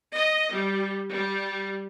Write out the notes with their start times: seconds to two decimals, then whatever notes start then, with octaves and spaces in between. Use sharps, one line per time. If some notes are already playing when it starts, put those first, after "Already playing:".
0.13 D#5
0.51 G3
1.10 G3